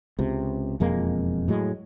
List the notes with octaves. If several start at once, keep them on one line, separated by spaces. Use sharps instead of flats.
C#2 C3
E1 F2 G#3 A#3
A2 F#3 G#3